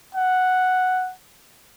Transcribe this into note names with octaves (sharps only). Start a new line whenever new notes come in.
F#5